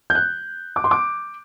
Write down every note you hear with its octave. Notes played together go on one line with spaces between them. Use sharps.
G6
F#6
D6
C6
D6